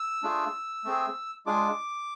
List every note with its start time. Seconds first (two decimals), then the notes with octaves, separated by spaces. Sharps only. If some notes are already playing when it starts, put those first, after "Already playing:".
Already playing: E6
0.23 A3 D4 F4 G#4
0.84 A3 C4 G#4
1.46 G#3 D4 F4 G#4 D6